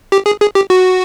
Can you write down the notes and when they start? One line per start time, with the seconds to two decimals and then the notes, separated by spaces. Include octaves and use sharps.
0.12 G4
0.26 G#4
0.41 G#4
0.55 G4
0.70 F#4